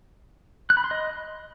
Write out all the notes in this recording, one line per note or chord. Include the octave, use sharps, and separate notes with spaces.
F#6
B5
C6
D#5